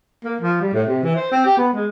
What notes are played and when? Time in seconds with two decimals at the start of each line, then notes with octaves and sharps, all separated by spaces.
0.25 A#3
0.41 F3
0.61 G3
0.73 A2
0.88 C3
1.03 E3
1.16 C5
1.32 C4
1.45 G4
1.58 B3
1.73 G#3